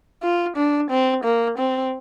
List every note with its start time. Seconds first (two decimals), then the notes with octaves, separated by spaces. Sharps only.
0.23 F4
0.57 D4
0.90 C4
1.24 A#3
1.58 C4